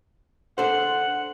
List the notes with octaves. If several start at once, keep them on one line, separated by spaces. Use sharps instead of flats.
D4 A4 C5 F#5